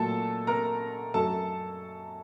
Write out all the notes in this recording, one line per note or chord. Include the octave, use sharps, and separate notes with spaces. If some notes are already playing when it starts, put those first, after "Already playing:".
Already playing: A#2 F#3 A3 A4 A5
A#4 A#5
F#2 F#3 A3 A4 A5